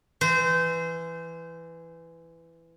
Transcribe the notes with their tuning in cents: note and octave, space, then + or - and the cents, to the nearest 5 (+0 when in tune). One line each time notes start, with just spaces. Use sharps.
E3 +10 C5 -25